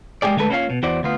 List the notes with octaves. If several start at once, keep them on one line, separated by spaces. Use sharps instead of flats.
G#3 A#3 D4 G4 G#4 D5
D3 G#3 A3 A4 B4
A#3 C#4 E4 F4 C#5 F5
B2
E2 E4 F#4 C5 D5
D2 B3 F4